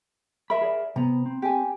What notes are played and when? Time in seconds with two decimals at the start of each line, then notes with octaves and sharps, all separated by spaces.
0.50 A#4 E5 B5
0.62 G#4 D5
0.96 C3 B3 A#5
1.26 C4
1.42 G4 G#5